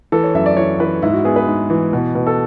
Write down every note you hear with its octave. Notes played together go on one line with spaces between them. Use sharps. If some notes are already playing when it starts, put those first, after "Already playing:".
E3 A4
C#5
F#2 E5
D5
E3 C#5
E3 B4
G#2 E4
F#4
B3 G#4
B4
G#2
E3
B2
B2
A4